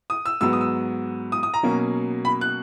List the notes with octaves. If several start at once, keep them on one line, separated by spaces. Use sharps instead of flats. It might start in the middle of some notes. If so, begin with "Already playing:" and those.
D#6
E6
G#2 F#3 B3 E6
D#6
E6
D#6
D#6
A#5
B2 F#3 A#3 C#4
B5
F#6